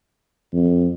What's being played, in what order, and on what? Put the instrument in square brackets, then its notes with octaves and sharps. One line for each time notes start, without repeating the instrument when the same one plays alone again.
[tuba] F2